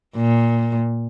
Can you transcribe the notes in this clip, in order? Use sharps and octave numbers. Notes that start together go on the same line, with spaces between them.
A#2